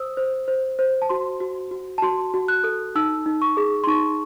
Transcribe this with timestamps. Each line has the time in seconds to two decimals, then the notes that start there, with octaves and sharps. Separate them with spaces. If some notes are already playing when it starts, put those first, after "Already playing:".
Already playing: C5 D#6 E6
0.17 C5
0.48 C5
0.79 C5
1.02 A5
1.09 F#4 C6
1.40 F#4
1.71 F#4
1.98 A5
2.02 F#4 C6
2.34 F#4
2.48 F#6
2.64 A4
2.95 D#4 E6
3.26 D#4
3.42 C#6
3.57 G#4
3.84 C6
3.87 D#4 C#6